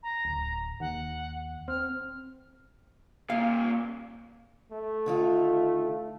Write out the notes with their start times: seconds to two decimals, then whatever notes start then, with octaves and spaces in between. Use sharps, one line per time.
0.03 A#5
0.25 D1
0.80 D#2 F#5
1.68 C4 F6
3.30 D#2 A#2 F5
4.72 A3
5.06 D3 D#3 F4